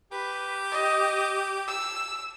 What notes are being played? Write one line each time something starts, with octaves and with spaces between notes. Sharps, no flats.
G4 B4
D#5
E6